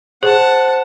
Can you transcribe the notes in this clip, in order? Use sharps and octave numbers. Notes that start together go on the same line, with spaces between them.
G#4 C5 F#5 A5